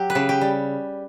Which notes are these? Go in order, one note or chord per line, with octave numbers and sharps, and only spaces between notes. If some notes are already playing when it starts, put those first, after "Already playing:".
Already playing: F#3 G4
B4
C#3
G4
G3